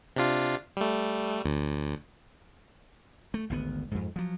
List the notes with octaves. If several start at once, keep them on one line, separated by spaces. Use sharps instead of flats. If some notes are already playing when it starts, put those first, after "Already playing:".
C3 D4 F4
G3 A3
D2
A3
G#1 D2 B3
F2 G#2
F3 F#3